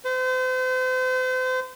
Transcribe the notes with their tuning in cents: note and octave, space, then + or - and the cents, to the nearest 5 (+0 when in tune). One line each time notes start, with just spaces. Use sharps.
C5 -40